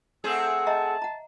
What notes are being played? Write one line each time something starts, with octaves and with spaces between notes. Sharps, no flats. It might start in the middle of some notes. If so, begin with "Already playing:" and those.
A3 C4 G#4 F#5 G#5 E6
D#5 E5 A5 A#5
F#5 A#5